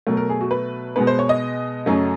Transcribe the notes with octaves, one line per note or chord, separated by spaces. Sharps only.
B2 F#3 A3 A#4
A#4
G#4
F#4
B4
B2 G#3 B3 B4
C5
C#5
D#5
F#2 C#3 F#3 A3